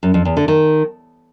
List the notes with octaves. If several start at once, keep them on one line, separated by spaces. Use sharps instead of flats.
F#2
F2
E2
D3
D#3